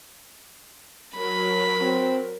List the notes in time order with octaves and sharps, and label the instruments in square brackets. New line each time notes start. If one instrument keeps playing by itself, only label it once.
[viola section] F#3 A#4 [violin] B5
[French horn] C4